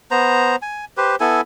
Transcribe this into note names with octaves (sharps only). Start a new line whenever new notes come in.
B3 C5 A#5
G#5
G4 B4 C5
B3 E4 A4 G#5